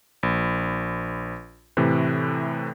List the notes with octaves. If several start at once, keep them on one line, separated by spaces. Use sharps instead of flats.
A#1
A2 C3 E3